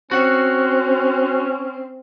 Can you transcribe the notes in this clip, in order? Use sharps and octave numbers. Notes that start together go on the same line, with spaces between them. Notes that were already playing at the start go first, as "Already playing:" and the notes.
C4 C#4 F#4 F#5